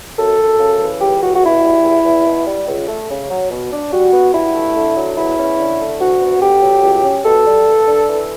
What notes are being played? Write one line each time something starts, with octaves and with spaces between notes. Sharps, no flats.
F#2 A4
F#2
C#3
E3
C#2 G4
C#2 F#4
F#4
B2 E4
G3
E2
E2
B2
G3
C#2
A3
C#3
F#3
B2
D4
G3 F#4
B3
G2 E4
A3
D3
F#3
E2 E4
C#4
D3
A3
D2 F#4
B3
D3 G4
F#3
C#2
C#4
B2 A4
G3
G2
D4
E3